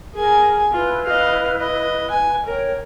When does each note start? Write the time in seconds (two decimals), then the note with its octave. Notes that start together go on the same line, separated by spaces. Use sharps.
0.14 G#4 A#4 G#5
0.73 E4 F4 B4
1.06 D#5 F5
1.59 D#5
2.10 G#5
2.46 A#4 C#5 G5